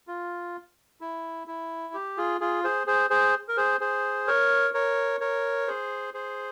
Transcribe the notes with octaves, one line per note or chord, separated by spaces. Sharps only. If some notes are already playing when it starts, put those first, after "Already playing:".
F4
E4
E4
G4
F4 G#4
F4 G#4
G#4 C5
G#4 C5
G#4 C5
A#4
G#4 C5
G#4 C5
A#4 C#5
A#4 C#5
A#4 C#5
G#4 C5
G#4 C5